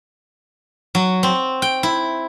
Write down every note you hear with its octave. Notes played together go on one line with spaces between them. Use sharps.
F#3
C4
G5
E4